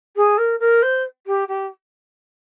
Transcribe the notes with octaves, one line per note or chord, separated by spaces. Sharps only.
G#4
A#4
A#4
C5
G4
G4